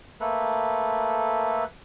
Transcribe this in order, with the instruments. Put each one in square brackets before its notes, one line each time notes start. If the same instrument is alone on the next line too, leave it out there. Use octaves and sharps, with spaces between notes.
[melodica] A3 A#3 A4 B4